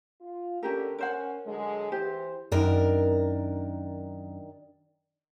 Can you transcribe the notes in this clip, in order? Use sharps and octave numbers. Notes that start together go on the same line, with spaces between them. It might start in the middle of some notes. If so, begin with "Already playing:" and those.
F4
D3 C#4 G4 A#4
C#4 A#4 C5 F#5
D3 F#3 G#3
E3 G4 C5
F#2 D#3 D4 A#4